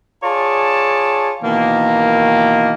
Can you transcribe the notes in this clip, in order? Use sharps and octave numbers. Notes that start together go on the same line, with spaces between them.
F4 G#4 C#5 D5 A5
B2 D#3 E3 A#3